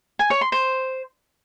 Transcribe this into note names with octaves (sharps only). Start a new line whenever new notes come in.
G#5
C#5
C6
C5